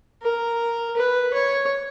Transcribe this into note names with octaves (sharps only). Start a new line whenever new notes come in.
A#4
B4
C#5